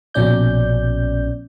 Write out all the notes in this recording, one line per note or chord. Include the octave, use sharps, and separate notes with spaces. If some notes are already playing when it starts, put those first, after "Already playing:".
A#1 B2 C#4 D5 G6